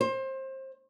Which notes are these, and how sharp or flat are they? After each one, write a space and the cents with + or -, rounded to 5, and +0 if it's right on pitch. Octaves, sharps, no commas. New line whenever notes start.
C5 +25